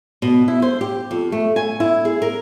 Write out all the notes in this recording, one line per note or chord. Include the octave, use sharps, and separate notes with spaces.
B2
E4
C5
G4
F2
A3
G#5
E4
G#4
A#4